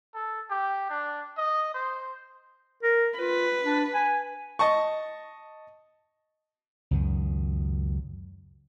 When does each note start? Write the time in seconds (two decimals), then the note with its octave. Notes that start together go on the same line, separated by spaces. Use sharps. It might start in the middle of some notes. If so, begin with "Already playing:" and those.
0.14 A4
0.50 G4
0.90 D4
1.37 D#5
1.74 C5
2.83 A#4
3.19 F4 B4
3.64 D4
3.94 G#5
4.59 D#5 A5 C#6
6.91 C#2 F#2 D#3